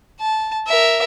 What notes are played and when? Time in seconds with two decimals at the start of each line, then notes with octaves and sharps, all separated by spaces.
0.20 A5
0.68 A#4 E5